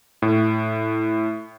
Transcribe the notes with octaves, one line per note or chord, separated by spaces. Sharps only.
A2